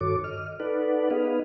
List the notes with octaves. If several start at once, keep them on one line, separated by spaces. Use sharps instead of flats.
G2 D#3 F#4 A4 C#5 D6
D#5 F6
D#4 A4 B4 D5 F#5
B3 D#4 G#4 B4 D#5 F5